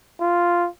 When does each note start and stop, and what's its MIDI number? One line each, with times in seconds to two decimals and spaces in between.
0.21 0.68 65